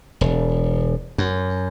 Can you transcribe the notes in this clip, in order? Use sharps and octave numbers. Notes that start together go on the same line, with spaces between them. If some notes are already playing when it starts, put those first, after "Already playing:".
E1
F#2